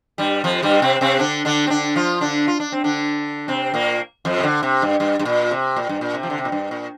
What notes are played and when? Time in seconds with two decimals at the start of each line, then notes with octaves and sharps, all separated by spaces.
0.18 G2 G3
0.44 F2 F3
0.62 G2 G3
0.82 C3 C4
1.01 C3 C4
1.19 D3 D4
1.45 D3 D4
1.67 C4
1.70 D3 D4
1.96 F3 F4
2.21 D3 D4
2.48 F4
2.60 D4
2.72 C4
2.84 D3 D4
3.48 C3 C4
3.74 A#2 A#3
4.25 F2 F3
4.38 C3
4.43 D3
4.63 C3
4.82 G2
5.00 G2
5.19 G2
5.25 A#2
5.51 C3
5.76 A#2
5.89 G2
6.01 A#2
6.14 C3
6.23 F3
6.30 D3
6.38 C3
6.45 A#2
6.52 G2
6.71 A#2